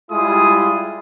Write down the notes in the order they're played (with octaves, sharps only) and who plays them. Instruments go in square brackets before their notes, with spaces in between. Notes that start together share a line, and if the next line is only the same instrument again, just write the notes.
[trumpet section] G3 G#3 E4 F4 G#4 D#6